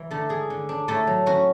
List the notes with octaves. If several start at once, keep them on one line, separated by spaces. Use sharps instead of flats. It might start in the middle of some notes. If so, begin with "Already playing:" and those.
Already playing: E3 E4
D3 A3 A4
G#3 G#4
D3
D4
A2 A3 A4
F#3
C#4 F#4